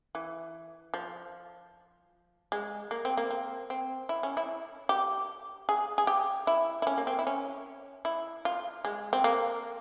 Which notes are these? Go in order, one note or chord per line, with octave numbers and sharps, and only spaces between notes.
E3
F3
G#3
A#3
C4
A#3
C4
C4
E4
C#4
E4
G4
G#4
G#4
G4
E4
E4
C#4
A#3
C4
E4
C#4
E4
F4
G#3
C4
A#3